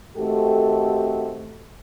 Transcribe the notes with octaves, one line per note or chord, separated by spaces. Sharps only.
D#3 A3 C4 F#4 G4 A4